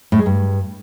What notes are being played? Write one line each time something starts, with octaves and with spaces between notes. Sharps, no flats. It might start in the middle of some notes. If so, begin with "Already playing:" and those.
A2
G#3
G2